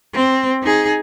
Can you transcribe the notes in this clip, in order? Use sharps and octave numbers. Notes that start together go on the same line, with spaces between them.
C4
D#4 G#4